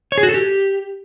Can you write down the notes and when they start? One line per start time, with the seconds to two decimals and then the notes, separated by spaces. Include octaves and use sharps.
0.12 C#5
0.18 G#4
0.23 F#4
0.29 A4
0.34 G4